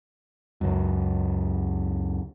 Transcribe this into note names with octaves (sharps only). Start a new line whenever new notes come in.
C#2 F#2